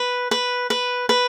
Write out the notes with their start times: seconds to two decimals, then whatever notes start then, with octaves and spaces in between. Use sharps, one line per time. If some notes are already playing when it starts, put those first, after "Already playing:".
Already playing: B4
0.31 B4
0.70 B4
1.09 B4